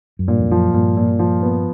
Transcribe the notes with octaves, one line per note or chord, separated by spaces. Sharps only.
F#2
G2 A#2
F2
F#2 F3
G2 A#2
A#2
F3
B3